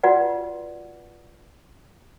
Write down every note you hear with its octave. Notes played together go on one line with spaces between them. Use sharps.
F4 F#4 B4 D5 F#5